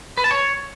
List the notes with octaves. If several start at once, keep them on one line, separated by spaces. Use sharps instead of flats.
B4
A5
C#5